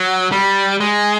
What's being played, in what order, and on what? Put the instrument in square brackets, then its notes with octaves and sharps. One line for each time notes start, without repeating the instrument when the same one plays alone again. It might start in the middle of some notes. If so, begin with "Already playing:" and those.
Already playing: [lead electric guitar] F#3
G3
G#3